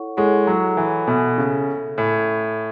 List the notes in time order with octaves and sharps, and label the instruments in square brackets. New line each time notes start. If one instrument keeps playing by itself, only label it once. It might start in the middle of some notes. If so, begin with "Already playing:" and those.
Already playing: [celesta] E4 A4 C#5 F#5 C#6
[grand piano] G#3 [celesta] E4 A4 C#5 F#5 C#6
[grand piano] F#3
E3
[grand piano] B2 [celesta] A4 E5 G#5
[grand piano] C#3
[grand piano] A2 [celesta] A4 E5 G#5